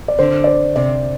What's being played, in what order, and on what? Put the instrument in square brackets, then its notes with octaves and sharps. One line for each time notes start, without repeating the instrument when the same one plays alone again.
[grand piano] D5
[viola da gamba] D3 [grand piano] C5
[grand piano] D5
C5
[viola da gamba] C3 [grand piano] D5